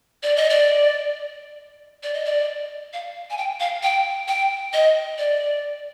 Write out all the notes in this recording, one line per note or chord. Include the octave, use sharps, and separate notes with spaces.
D5
D#5
D5
D5
D#5
D5
F5
G#5
G5
F5
G5
G5
D#5
D5